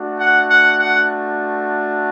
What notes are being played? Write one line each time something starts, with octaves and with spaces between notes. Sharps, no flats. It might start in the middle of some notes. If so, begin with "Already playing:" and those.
Already playing: A3 D4 F#4
F#5
F#5
F#5